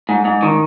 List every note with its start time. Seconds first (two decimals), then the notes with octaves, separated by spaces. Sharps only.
0.09 G#2
0.25 G#2
0.43 D#3